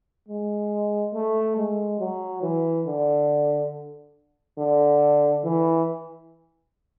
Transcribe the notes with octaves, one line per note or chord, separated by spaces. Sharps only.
G#3
A3
G#3
F#3
E3
D3
D3
E3